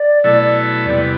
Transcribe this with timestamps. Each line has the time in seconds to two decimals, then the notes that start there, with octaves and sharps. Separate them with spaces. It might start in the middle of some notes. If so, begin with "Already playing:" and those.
Already playing: D5
0.24 B2 F#3 A3 E4 A4
0.86 E2 C3 E3 G3 B3 D5